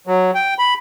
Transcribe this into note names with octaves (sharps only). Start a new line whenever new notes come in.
F#3
G5
B5